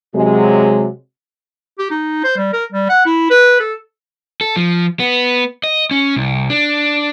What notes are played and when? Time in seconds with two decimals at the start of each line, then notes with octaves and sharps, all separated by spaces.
0.15 C3 F#3 G#3
1.79 G4
1.91 D#4
2.24 C5
2.38 G3
2.53 A#4
2.72 G3
2.89 F#5
3.06 E4
3.30 B4
3.60 A4
4.41 A4
4.57 F3
5.00 B3
5.64 D#5
5.91 C#4
6.16 C2
6.50 D4